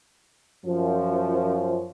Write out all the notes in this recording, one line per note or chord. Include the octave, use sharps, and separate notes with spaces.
F#2 F3